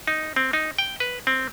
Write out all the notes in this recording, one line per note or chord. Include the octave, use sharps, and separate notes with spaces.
D#4
C4
D#4
G5
B4
C4